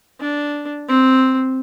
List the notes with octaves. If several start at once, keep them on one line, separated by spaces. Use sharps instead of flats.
D4
C4